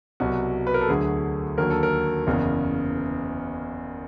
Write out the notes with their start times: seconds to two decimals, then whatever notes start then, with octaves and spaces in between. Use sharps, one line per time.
0.20 C2 B2 F#3 F#4
0.67 B4
0.74 A#4
0.81 A4
0.89 D2 D3 F#3 G#4
1.58 D#2 D3 F#3 A#4
1.70 A4
1.83 A#4
2.27 F#1 E2 C#3